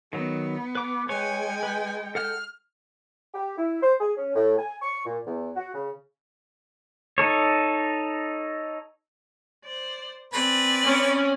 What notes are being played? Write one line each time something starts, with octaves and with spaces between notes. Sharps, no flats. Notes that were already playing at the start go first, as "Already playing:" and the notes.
D#3 F#3 B3
B4 D6
G#3 B4 C#5 G5 G#5 C#6
B4
A4 F#5 F6 G6
G4
E4
C5
G#4
C#4
A2
G#5
C#6
A#2
E2
F#4
C#3
D#4 A4 C#5
C5 D5
C4 B4 D5 G#5
C#4